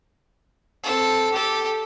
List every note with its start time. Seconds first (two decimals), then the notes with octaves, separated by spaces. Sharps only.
0.83 C4 A4
1.32 G4 A4